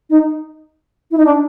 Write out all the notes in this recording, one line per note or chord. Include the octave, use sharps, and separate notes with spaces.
D#4
E4
D#4
D4